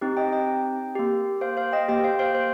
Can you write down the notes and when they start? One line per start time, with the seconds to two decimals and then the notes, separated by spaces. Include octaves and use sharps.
0.01 C4 D#4 G4
0.17 D#5 G5
0.32 D#5 G5
0.95 A#3 G4
1.41 C5 F5
1.57 C5 F5
1.72 D#5 G5
1.88 A#3 G4 D#5 G5
2.04 C5 F5
2.19 C5 F5
2.35 C5